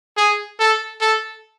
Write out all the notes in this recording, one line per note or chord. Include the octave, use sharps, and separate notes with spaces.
G#4
A4
A4